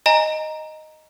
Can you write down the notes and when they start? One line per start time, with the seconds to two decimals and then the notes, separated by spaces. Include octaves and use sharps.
0.06 D#5 G#5 A#5